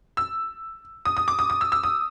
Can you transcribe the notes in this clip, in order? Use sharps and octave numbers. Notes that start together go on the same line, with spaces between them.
E6
D#6
D#6
D6
D#6
D#6
E6
E6
D#6